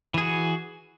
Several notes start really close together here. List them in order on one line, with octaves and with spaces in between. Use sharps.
E3 G#4 F#4